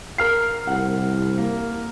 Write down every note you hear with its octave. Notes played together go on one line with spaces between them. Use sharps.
A#4 F6 C7
C2 F#5
A#3